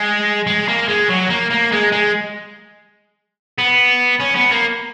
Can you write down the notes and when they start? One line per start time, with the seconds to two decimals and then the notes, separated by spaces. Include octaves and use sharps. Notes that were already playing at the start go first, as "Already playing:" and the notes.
Already playing: G#3
0.47 G#3
0.68 A#3
0.88 G#3
1.09 F#3
1.30 A#3
1.50 A#3
1.72 G#3
1.92 G#3
3.58 B3
4.20 C#4
4.36 B3
4.51 A#3